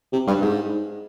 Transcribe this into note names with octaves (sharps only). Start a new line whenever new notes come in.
C3
G2
G#2